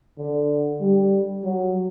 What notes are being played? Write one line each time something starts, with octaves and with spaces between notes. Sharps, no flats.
D3
G3
F#3